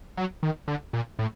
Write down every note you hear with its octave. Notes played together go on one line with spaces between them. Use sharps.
F#3
D#3
D3
A#2
A2